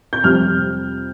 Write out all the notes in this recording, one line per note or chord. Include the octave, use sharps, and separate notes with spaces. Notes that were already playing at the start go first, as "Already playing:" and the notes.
G6
F2 C3 G3 F6